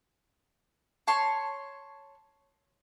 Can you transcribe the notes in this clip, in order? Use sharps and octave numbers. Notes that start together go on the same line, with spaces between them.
C#5 A5 C6 C#6